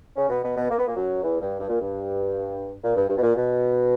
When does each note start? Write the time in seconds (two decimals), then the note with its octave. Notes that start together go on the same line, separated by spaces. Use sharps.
0.16 C#3 C#4
0.29 B2 B3
0.43 B2 B3
0.56 B2 B3
0.70 A#3
0.78 B3
0.87 A#2 A#3
0.96 F#2 F#3
1.23 E2 E3
1.41 G2
1.59 G2
1.69 A#2
1.81 G2
2.83 A#2
2.96 G2
3.09 G2
3.17 B2
3.22 A#2
3.36 B2